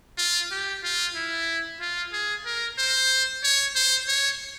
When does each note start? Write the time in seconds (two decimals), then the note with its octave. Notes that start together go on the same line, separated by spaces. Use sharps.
0.18 F4
0.51 G4
0.84 F4
1.15 E4
1.80 F4
2.13 G#4
2.46 A#4
2.78 C5
3.43 C#5
3.75 C5
4.08 C#5